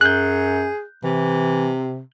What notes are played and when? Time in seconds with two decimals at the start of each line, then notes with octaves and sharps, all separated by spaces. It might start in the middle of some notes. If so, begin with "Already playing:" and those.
0.01 F#2 G#4 F#6 G6
1.04 C3 E3